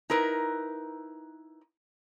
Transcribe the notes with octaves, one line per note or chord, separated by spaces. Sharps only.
D#4 E4 A#4 B4